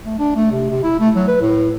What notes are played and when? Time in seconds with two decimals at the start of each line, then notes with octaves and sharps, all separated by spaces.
0.05 A3
0.19 D4
0.36 A3
0.52 C3
0.70 C3
0.83 E4
1.00 A3
1.16 F#3
1.28 B4
1.41 A2